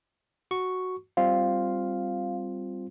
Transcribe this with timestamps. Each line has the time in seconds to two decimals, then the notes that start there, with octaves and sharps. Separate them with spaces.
0.51 F#4 C#6
1.17 G3 C4 F4 F5